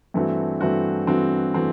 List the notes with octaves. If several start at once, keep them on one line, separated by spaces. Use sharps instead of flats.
G2 E3 A3 C4 F#4
G2 E3 A3 C4 F#4
G2 E3 A3 C4 F#4
E3 A3 C4 F#4